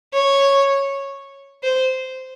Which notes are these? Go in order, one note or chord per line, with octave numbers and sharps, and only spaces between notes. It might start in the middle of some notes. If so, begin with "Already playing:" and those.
C#5
C5